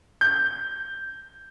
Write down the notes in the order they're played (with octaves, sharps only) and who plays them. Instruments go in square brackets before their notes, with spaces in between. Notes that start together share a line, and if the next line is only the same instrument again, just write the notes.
[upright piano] G6